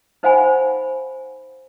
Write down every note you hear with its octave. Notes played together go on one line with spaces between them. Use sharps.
D#4 C5 F5 F#5 G#5 B5